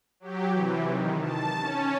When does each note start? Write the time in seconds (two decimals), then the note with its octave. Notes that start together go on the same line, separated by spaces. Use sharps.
0.20 F#3 G4
0.53 C3 E3
0.85 D#3
1.20 A5
1.58 C#4